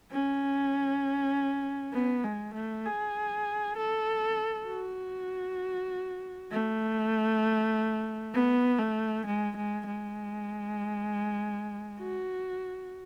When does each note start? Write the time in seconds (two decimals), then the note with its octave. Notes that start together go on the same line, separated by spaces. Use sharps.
0.11 C#4
1.93 B3
2.24 G#3
2.54 A3
2.85 G#4
3.77 A4
4.68 F#4
6.51 A3
8.34 B3
8.79 A3
9.26 G#3
9.56 G#3
9.87 G#3
11.99 F#4